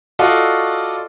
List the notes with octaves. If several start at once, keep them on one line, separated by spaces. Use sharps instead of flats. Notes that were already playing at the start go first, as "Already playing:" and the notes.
F4 F#4 A4 D5 D#5